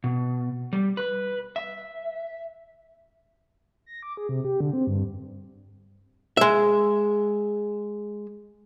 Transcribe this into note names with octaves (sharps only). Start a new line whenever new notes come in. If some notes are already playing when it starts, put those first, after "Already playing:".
B2
G3
B4
E5
A#6
D6
G#4
C3
G4
D3
C4
G2
G#3 E5